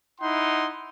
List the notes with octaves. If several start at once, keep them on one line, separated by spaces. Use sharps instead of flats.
D#4 E4 F#5 C6